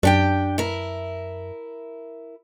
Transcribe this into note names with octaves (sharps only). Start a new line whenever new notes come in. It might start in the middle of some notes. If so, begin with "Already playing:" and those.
F#2 D4 G4 G5
E4 A#4